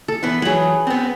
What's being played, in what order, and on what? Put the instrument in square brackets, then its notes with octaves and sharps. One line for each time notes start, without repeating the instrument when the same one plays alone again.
[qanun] A4
[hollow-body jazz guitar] E3 B3
[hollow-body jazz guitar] E3 F#3 [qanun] G#4 B4
[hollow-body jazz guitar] B3 C4